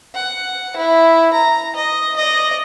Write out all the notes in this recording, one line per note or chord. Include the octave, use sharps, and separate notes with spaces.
F#5
E4
A#5
D#5
D5 D#5